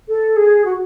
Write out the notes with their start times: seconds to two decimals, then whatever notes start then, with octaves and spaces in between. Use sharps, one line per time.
0.08 A4
0.36 G#4
0.65 F#4